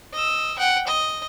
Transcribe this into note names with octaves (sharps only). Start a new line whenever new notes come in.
D#5 E6
F#5 G5
D#5